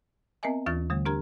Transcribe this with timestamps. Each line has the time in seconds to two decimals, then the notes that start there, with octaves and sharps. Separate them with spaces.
0.43 B3 C4 A#4 D#5 E5 G#5
0.66 D#2 E3 F4 C#6 A6
0.90 D3 G3 A3
1.05 D4 G4 A#4 A#5 G#6